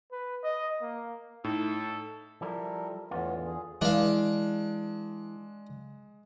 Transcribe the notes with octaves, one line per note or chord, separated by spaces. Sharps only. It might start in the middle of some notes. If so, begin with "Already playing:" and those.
B4
D#5
A#3
A2 D#4 A4
F3 G3 E4 A4 A#4
E2 A2 D3 E3 B3 F4
G#4
E3 G#3 D4 F5